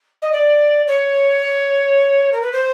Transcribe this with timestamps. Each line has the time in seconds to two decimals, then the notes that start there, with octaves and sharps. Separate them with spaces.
0.22 D#5
0.32 D5
0.87 C#5
2.32 A#4
2.42 B4
2.53 C5